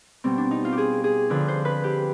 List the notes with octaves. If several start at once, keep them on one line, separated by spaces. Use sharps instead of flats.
B2 G3 C4
D4
D#4
F4
G4
G#4
G#4
D3 F3 B4
C5
B4
G4